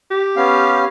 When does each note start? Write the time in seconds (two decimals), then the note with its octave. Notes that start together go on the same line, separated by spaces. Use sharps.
0.11 G4
0.36 B3 C#4 F5